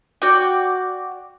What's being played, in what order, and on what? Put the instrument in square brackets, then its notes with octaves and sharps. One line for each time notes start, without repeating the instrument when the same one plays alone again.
[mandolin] F#4 D5 G5